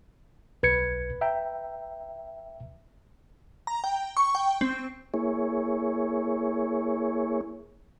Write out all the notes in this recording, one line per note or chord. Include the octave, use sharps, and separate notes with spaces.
B1 B4 G#6 C#7
E5 G5 A#5
A#5
G5
C#6
G5
C4
A#3 E4 G#4 C#5